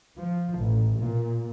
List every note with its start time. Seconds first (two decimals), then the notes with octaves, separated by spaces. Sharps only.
0.17 F3
0.56 A1
0.95 A#2